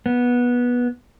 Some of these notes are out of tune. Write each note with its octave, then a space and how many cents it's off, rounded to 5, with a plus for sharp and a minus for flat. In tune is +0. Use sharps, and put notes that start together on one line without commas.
B3 -15